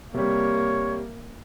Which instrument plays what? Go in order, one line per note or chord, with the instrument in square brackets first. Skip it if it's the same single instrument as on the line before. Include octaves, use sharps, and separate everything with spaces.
[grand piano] C3 G3 [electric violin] A#3 [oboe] C#5